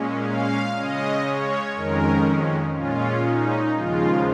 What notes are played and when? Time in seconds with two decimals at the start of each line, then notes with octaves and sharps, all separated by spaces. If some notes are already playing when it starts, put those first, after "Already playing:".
Already playing: A#2 G#3 C#4
0.27 F5
0.76 C#3 G#3 C#4 D#5
1.27 C#5
1.75 F2 D#3 G#3 C#4 A#4
2.75 A#2 G#3 C#4 F4
3.25 D#4
3.74 D#2 C#3 F3 G#3 F4